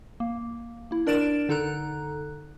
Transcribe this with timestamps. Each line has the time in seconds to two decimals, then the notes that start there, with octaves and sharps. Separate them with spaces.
0.20 A#3
0.91 A#3 E4
1.07 D4 A#4 D5 A6 D7 E7
1.49 D3 D#4 A4 A#5 F#6